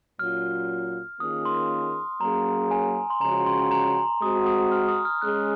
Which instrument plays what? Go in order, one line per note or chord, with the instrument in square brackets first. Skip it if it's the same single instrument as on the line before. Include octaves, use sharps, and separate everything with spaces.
[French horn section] A#2 F#3 C#4 F4 [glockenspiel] F6
[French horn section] D#3 A#3 C#4 F4 G#4 [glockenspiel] D#6
[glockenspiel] C6
[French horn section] F#3 A#3 C#4 G#4 [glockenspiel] A#5
[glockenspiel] G#5
C6
[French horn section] C#3 F3 G#3 C#4 F#4 [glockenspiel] A#5
[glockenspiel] C6
A#5
[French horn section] G#3 C4 F#4 [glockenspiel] D#6
[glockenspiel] D#6
F6
D#6
F6
[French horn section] G#3 C#4 G#4 [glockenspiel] F#6